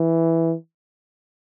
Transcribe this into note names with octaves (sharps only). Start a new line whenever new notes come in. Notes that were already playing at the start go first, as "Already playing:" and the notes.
Already playing: E3